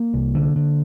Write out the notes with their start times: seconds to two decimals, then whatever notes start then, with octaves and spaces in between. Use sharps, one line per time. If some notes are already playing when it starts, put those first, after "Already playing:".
Already playing: A#3
0.14 C2
0.35 D3
0.56 D3